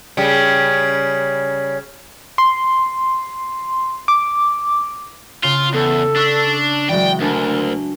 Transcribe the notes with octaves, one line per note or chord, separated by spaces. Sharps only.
C#3 G3
C6
D6
C#3 F4
E2 A4
D4 C#6 E6 B6
E3 F#3 G#3 D5 G5
D2 D4 A#4 G#5 A5